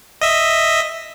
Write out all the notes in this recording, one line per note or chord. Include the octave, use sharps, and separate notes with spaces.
D#5 E5